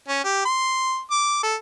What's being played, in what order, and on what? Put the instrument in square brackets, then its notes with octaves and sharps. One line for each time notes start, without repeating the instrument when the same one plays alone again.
[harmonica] C#4
G4
C6
D6
A4